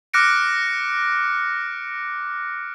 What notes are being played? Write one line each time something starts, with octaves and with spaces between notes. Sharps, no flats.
D6 F6 F#6 A#6 C#7 D7